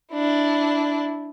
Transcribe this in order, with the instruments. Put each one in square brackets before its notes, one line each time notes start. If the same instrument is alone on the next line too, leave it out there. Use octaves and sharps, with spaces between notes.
[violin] D4 E4